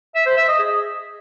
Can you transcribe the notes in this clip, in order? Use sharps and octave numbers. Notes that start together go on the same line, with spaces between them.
E5
C5
E5
D#5
G#4